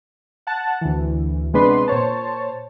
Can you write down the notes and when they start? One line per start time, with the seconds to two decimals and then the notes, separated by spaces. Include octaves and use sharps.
0.47 F#5 A5
0.81 D2 E3
1.53 C3 G#3 B3 D4 B4 C6
1.88 A#2 C5 C#5 A5